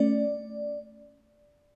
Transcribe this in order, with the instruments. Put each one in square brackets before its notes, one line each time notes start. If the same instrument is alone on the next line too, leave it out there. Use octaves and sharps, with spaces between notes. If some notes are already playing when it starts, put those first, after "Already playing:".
Already playing: [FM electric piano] A3 C#4 D5